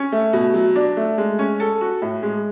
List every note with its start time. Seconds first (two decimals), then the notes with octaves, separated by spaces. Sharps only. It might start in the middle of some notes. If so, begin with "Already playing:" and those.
Already playing: C#4
0.12 A3
0.33 B2
0.54 F#3
0.76 D4
0.97 A3
1.18 G#3
1.39 C#4
1.60 A4
1.81 F#4
2.02 A2
2.23 G#3